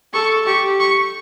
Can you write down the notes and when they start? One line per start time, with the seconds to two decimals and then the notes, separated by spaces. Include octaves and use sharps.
0.14 A4 C#6
0.46 G4 C#6
0.80 C#6